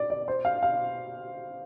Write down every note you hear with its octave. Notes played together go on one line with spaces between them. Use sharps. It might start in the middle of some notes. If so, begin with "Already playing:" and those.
Already playing: D5
D5
C5
F5
F5